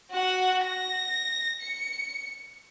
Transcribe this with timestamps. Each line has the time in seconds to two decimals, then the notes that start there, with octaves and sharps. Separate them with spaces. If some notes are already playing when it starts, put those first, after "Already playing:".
0.12 F#4 F#5
0.65 A#6
1.62 C#7